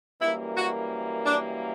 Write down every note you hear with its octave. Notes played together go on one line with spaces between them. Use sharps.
F#2 E3 G3 A#3 E4
F#4
D4